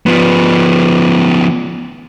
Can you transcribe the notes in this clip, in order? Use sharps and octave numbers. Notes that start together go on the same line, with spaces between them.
F3 B3